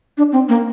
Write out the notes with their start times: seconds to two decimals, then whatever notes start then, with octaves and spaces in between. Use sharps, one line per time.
0.18 D4
0.32 C4
0.49 A#3